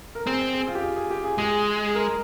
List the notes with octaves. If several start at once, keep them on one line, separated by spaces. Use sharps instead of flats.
A#4
C4 G#4
G#4
F4
G4
G#4
G#4
G4
G#4
G#3 G#4
A#4